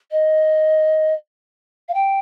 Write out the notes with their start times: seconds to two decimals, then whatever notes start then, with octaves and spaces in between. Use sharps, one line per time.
0.11 D#5
1.88 F5
1.94 G5